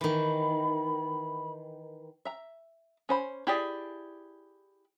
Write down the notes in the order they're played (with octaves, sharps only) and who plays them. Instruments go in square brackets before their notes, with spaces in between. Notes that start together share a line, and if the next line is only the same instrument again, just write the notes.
[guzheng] D#3 E3 [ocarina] B5
[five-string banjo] E5 A#5
C#4 C5 B5
E4 G4 G#4 D5